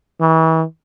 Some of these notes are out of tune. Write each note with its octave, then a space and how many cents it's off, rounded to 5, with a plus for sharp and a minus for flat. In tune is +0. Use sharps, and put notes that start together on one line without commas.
E3 -35